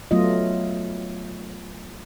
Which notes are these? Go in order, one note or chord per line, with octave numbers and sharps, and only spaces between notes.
F#3 A3 B3 F4 D#5